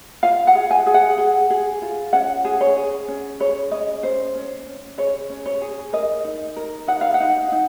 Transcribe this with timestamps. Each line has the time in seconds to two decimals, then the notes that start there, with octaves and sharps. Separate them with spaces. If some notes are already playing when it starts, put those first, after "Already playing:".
0.23 F4 F5
0.47 F#5
0.55 G#4
0.71 G#5
0.86 G#4
0.94 F#5
1.18 G#4
1.50 G#4
1.82 F4
2.13 C#4 F#5
2.45 G#4
2.61 C#5
2.77 G#4
3.08 C#4
3.40 G#4 C#5
3.71 C#4 D#5
4.03 C#4 C5
4.35 C#4
4.67 C#4
4.98 G#4 C#5
5.30 C#4
5.46 C#5
5.62 G#4
5.93 A#4 D#5
6.24 D#4
6.56 A#4
6.88 D#4 F#5
7.01 F5
7.14 F#5
7.20 D#4
7.52 D#4